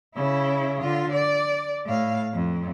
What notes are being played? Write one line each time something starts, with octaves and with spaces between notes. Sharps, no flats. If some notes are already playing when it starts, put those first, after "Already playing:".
C#3 E4
D3 F4
D5
A2 F5
F2